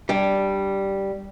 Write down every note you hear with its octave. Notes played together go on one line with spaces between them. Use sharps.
G3 D4